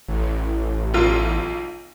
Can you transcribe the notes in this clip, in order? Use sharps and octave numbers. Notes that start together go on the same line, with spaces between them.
A1
B1 F4